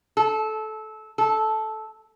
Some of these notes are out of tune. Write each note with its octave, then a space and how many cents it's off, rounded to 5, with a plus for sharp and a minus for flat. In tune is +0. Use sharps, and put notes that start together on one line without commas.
A4 -20
A4 -10